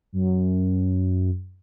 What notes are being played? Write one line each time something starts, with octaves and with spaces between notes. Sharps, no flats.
F#2